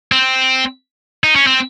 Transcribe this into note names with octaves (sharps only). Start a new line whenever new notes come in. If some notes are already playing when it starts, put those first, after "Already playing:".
C4
D#4
C#4
C4